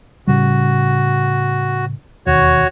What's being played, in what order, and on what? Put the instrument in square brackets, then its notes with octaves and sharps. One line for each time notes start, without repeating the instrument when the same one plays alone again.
[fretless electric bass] A2 C#3 G3 [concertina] F#4
[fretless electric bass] E1 D#2 [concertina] F#4 C#5